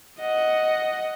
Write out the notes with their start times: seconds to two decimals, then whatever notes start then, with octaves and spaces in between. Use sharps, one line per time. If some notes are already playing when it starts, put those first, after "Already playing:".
0.20 D#5 F#5